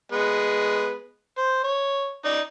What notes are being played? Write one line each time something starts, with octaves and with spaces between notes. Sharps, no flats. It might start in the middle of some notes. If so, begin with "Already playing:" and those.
G#3 B3
C5
C#5
D#4 D5